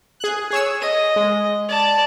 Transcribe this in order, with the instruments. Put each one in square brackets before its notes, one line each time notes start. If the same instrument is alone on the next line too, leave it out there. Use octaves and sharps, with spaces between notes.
[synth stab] G#4 F#6
G#4 C#5 E6
[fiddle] D#5 [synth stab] D#7
[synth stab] G#3
[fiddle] D5 A5